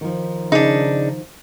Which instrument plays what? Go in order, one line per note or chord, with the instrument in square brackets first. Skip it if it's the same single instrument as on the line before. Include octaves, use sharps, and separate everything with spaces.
[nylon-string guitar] D#3 F3
[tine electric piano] C#3 [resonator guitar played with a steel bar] D4 D#4